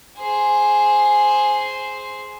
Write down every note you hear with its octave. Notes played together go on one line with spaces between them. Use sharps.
G#4 C5